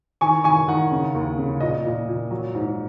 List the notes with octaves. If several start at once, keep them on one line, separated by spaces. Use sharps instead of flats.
D#3 G#5 C#6
D#3 G#5 C#6
D#3 F#5
C#3
D#2
C#3
A#2 D#5
A#2
A#2
F#3
G#2